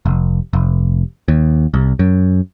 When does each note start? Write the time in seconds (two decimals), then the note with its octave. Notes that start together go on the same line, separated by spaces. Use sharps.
0.06 F1
0.53 F1
1.28 D#2
1.74 C2
1.99 F#2